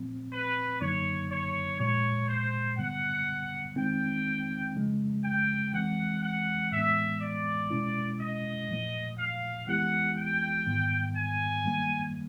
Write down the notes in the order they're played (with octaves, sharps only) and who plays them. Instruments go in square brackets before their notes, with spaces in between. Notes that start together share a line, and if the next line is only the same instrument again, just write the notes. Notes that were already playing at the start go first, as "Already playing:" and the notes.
Already playing: [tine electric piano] A#2 F3 A3 C4
[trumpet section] B4
[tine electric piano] F#2 D3 F#3 A#3 D#4 [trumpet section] C#5
[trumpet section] C#5
[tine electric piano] A#2 F3 G#3 [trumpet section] C#5
[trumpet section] C5
[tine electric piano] G2 D3 G3 B3 [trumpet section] F#5
[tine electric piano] D#3 G#3 C4 D#4 [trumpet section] G5
[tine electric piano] C#3 F3 G#3 C#4
[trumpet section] G5
[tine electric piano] E3 G#3 C4 [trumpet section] F#5
[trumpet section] F#5
[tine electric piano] A2 E3 G#3 B3 [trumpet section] E5
[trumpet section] D5
[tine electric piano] B2 G#3 C#4 E4
[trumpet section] D#5
[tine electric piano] A#2 F3 A3
[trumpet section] F5
[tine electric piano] E3 G#3 B3 E4 G4 [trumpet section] F#5
[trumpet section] G5
[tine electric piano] G#2 D#3 G3 B3
[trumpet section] G#5
[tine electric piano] G2 D#3 G3 A#3